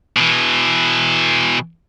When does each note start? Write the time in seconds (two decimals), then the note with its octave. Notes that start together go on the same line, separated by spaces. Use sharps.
0.17 B2 E3